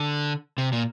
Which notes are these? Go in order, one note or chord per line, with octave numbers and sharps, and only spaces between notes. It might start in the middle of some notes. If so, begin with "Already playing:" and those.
Already playing: D3
C3
A#2